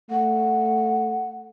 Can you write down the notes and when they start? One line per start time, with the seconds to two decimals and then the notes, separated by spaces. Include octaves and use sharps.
0.10 A3 F#5